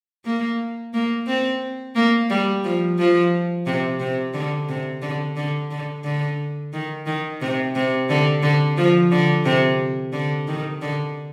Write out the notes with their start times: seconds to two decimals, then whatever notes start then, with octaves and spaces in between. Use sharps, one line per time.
0.25 A#3
0.94 A#3
1.27 C4
1.96 A#3
2.30 G3
2.64 F3
2.98 F3
3.66 C3
4.00 C3
4.34 D3
4.69 C3
5.02 D3
5.36 D3
5.71 D3
6.04 D3
6.73 D#3
7.06 D#3
7.41 C3
7.75 C3
8.10 D3
8.43 D3
8.77 F3
9.11 D3
9.45 C3
10.13 D3
10.48 D#3
10.82 D3